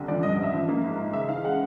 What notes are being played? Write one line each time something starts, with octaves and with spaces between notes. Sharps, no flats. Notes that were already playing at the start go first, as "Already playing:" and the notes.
Already playing: C2 D3
F3 D5
G2 D#5
D#5
G2
E5
F3
A#3
G#2
G#2
C#3 E5
E3 F5
G#3 F#5